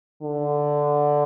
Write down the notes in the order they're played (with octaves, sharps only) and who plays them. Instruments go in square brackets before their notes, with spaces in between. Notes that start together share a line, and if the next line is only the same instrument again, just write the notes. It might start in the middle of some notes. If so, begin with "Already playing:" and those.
[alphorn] D3